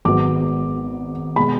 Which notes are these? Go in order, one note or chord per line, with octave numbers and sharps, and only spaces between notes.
G#1 G#2 F#3 B3 D6
B2 G#3 B5